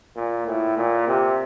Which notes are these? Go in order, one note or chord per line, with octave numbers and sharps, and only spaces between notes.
A#2
A2
A#2
C3